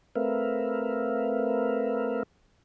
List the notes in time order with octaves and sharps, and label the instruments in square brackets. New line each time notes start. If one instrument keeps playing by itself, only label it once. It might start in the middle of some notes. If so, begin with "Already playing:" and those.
[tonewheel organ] A3 C4 A#4 B4 E5 F5